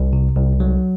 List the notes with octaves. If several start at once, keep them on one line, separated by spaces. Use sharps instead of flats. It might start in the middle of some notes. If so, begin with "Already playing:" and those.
Already playing: C2
C3
C2
F#3